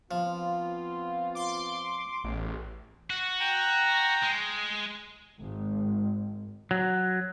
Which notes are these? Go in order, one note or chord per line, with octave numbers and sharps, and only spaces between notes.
F3 B3 C4 F4
C6 D6
A1 E2
F#4
G5 A#5
G#3
G#1
F#3